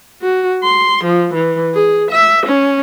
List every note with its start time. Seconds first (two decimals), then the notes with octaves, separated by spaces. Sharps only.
0.22 F#4
0.63 C6
1.04 F3
1.34 E3
1.75 G#4
2.11 E5
2.46 C#4